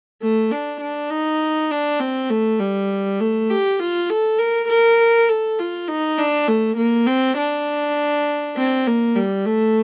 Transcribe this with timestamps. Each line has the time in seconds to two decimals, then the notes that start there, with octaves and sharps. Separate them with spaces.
0.21 A3
0.51 D4
0.81 D4
1.10 D#4
1.71 D4
2.00 C4
2.30 A3
2.60 G3
3.20 A3
3.50 G4
3.79 F4
4.09 A4
4.39 A#4
4.68 A#4
5.28 A4
5.58 F4
5.88 D#4
6.18 D4
6.48 A3
6.77 A#3
7.07 C4
7.37 D4
8.56 C4
8.87 A#3
9.15 G3
9.45 A3